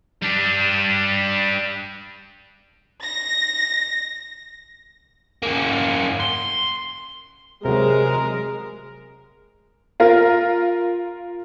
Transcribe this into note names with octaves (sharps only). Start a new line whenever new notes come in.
G3 D4
A#6
A#3 C#4
C6
C3 F#3 G#3 A#4
F4 A#4